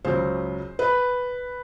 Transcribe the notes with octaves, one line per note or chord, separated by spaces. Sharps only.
C#2 C#3 F#3 C5
B4